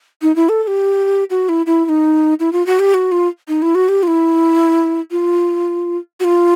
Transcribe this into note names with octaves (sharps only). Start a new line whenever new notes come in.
D#4
E4
A4
A4
G4
F#4
E4
E4
E4
D#4
E4
F4
F#4
G4
F#4
F4
D#4
E4
F#4
G4
F4
E4
F4
F#4
F4